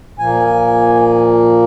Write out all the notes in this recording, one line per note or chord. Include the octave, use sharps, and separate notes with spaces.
A#2 F3 A#3 G#5